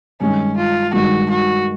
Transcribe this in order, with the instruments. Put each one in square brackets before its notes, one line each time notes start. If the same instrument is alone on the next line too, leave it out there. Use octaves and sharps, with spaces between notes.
[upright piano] G2 D#3 G#3 [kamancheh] C#4
[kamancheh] F4
[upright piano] G2 D#3 G#3 [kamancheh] F#4
[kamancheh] F#4